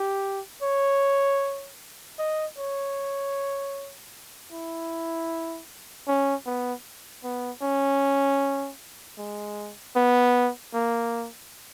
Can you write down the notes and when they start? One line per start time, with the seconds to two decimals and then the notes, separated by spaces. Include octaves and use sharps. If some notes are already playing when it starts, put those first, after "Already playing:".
Already playing: G4
0.62 C#5
2.19 D#5
2.58 C#5
4.52 E4
6.08 C#4
6.46 B3
7.24 B3
7.62 C#4
9.18 G#3
9.96 B3
10.74 A#3